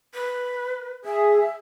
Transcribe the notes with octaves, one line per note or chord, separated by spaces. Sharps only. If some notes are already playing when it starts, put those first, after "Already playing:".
B4
G#4 E5